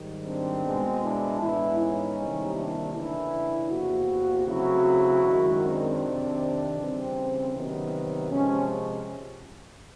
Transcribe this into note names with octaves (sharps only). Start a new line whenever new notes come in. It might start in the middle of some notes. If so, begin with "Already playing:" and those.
Already playing: G#2 D#3 G3
C4 D4
B2 G#3 B3
D4 E4
A2 E3 G#3 B3 D4 E4
C#4 D#4
C3 D#3 G3 A#3
D4 E4
C#3 E3 A3 D4 E4
E2 C3 F3 A#3 E4 F#4
C#3 F#3 A3 C4 E4 F#4
F#2 D#3 G#3
C4 D4
F2 C3 D#3
C#3 E3 G3 C4
C#4
C3 D#3 F#3 B3
C3 F3 G#3 C#4